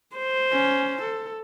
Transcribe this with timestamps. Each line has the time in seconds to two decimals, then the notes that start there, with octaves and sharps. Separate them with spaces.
0.17 C5
0.51 C#4
1.02 A4